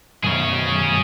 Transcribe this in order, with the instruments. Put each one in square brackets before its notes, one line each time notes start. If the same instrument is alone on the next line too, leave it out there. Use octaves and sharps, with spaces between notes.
[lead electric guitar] B1 F#2 [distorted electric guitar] G#4 C#5